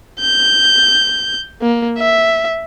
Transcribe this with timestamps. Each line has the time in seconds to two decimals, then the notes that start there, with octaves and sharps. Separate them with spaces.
0.20 G6
1.62 A#3
1.98 E5